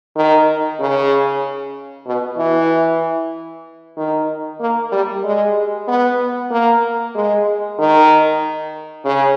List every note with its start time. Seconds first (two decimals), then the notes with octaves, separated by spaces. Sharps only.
0.16 D#3
0.80 C#3
2.07 B2
2.38 E3
3.97 D#3
4.60 A#3
4.92 G3
5.24 G#3
5.88 B3
6.51 A#3
7.15 G#3
7.79 D#3
9.05 C#3